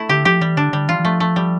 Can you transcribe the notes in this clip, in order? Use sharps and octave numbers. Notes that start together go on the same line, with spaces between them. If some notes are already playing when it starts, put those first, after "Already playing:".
Already playing: A3 E4
D3 G4
F3 G4
E3 G3
D3 D4
D3 G3
E3 F4
E3
F3 A3
A3
G3